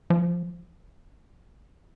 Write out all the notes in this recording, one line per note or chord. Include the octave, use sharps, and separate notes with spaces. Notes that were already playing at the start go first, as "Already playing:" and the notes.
F3